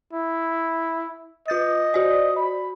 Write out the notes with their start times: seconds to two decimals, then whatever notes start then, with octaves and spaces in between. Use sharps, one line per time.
0.13 E4
1.48 F4 D#5 G6 A6
1.94 F#4 D5
2.37 B5